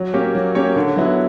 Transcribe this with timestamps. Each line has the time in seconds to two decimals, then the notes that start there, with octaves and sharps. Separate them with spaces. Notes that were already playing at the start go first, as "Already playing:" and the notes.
Already playing: F#3
0.13 A#3 C#4 G4 C#5
0.35 F#3
0.55 A#3 C#4 G4 C#5
0.76 D3
0.96 F#3 B3 E4